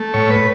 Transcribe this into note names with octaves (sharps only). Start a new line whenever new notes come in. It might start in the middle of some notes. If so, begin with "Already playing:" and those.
Already playing: A3
A2 C#5
B4